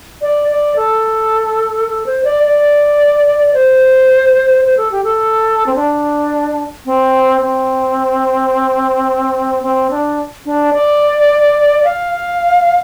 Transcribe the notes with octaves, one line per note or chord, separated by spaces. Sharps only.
D5
D5
A4
A4
C5
D5
D5
C5
C5
A4
G4
A4
C4
D4
C4
C4
C4
D4
D4
D5
F5